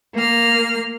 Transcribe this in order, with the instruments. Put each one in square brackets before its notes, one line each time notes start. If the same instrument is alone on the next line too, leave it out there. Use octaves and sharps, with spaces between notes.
[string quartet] A#3 F6